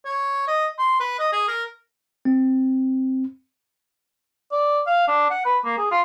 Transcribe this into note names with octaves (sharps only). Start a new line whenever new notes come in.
C#5
D#5
C6
B4
D#5
G#4
A#4
C4
D5
F5
D4
F#5
B4
A#3
G#4
F4